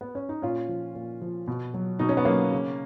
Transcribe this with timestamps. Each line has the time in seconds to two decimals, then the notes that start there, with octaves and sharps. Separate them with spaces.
0.01 B3
0.15 C#4
0.29 D#4
0.42 A#2 C#4 F4
0.69 F3
0.95 A#2
1.22 F3
1.48 B2
1.74 F#3
1.99 B2 D#4
2.09 C#4
2.17 B3
2.25 F#3 A#3 C#4
2.52 C#3